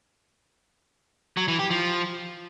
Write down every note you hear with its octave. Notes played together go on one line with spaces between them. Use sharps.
F#3
E3
G4
F3